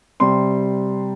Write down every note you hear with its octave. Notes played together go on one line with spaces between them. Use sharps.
C3 G3 C6